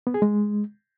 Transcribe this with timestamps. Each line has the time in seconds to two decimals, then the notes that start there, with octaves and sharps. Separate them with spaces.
0.07 B3
0.14 G#4
0.22 G#3